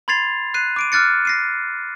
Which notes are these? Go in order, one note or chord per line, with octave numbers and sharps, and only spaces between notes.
B5 C6 G#6 A6 C7 F7
F#6 C7 D#7
D6 D7 D#7
D6 F6 F#6 A6 C#7
A#6 C7 D#7